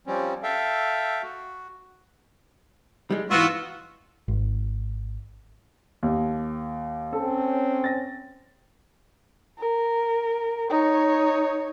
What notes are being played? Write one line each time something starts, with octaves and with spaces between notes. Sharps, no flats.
F3 G3 C4 C#4
A4 E5 F5 G5
F#4
G3 G#3
G#2 E3 B3 F4 F#4 E6
G#1
D#2
C4 C#4 A4
A6 A#6
A#4
D#4 C#5